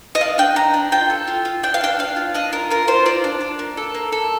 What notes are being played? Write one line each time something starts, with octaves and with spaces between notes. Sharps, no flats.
D#5
D4 F5
D4 G5
D4 A#5
D4
F4 G5
A4
F4
F4
D4 G5
F5
D4 G5
D4 F5
F4
D4 D#5
F4 A#4
F4 A#4
F4 C5
F4 D5
D4
D4
A#3
A4
A#3
A4